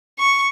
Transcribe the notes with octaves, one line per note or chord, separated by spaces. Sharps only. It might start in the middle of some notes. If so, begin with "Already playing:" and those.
C#6